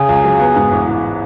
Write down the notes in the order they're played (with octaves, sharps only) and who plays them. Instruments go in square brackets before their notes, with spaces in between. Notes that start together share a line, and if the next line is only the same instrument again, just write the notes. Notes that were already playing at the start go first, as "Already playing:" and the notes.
Already playing: [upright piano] C#3 C#4 [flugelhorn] G#4
[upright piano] C#2
F#3
B3
G#2
A1
E3